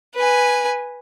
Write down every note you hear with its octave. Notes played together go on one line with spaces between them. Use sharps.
B4 G#5